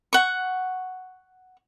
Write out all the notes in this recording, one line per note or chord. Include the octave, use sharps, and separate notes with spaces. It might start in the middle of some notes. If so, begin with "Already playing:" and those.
F#5 C#6